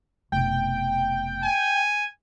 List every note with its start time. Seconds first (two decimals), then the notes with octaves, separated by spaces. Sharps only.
0.32 F1 B2 G5
1.43 G#5